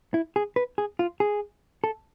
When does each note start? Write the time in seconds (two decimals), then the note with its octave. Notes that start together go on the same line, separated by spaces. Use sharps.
0.14 E4
0.36 G#4
0.56 B4
0.78 G#4
0.99 F4
1.20 G#4
1.84 A4